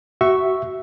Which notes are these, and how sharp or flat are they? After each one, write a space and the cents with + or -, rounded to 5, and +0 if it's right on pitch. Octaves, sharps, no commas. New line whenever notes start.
F#4 +30 E5 +0 C#6 +0